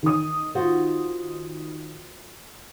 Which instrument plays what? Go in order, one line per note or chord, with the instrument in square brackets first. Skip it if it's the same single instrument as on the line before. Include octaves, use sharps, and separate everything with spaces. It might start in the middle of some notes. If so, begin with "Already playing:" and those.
[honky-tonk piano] D#3 D#6
[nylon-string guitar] F4 F#4 C5